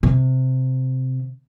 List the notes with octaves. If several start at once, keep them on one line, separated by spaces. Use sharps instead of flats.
C3